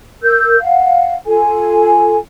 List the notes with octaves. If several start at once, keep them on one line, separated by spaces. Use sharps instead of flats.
A#4 E6 G6
F5 F#5
F4 A4 G#5